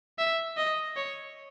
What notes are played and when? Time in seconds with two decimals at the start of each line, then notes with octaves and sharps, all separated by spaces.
0.18 E5
0.57 D#5
0.96 C#5